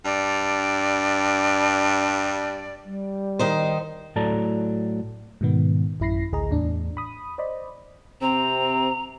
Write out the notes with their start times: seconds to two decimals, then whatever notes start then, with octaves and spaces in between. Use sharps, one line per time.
0.05 G2 D5
2.83 G3
3.39 D#3 D#4 C5
4.16 A2 F#3 A4 D5 A5 A#5
5.41 G#2 B2 D#3 B3
6.00 A1 F#2 E4 B5 A#6 C7
6.32 A1 D2 G#4 D#5 A#5
6.51 E2 A2 D4
6.97 B5 D#6
7.38 C5 D5 D#5 B5
8.22 C3 C4 A#5